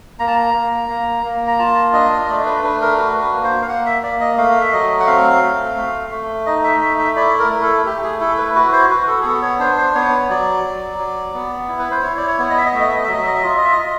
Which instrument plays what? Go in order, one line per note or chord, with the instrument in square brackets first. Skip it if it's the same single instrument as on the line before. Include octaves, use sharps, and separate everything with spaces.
[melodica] A#3 A#5
A5
A#5
A#3
A#3
A#3
A#5
F4 A5
D4 D#5
D#5
A3 D5
B4
D4 B4
A#4
F#4 B4
B4
A#3
C5
F5
A#3 F#5
E5
A#3 D5
D#5
A3 F5
E5
F#3 D#5
F#5
C4 F5
A3
A3
A3
D#4 D#5
E5
A3 E5
E5
E4 D5
A#4
A3 A#4
A4
A3 G4
G#4
E4 A4
B4
F#4 B4
C5
F#4 B4
A4
G#4
B3 A4
C#5
D4 C5
C5
B3 C#5
C#5
F#3 D5
F#3
F#3
B3
E4
B4
C5
E4 C#5
D5
C#5
B3
D#5
E5
D#5
A3 E5
D#5
E5
D#5
E5
F#3 D#5
E5
D#5
E5
F4 D#5
E5
D#5
E5
D#5
F4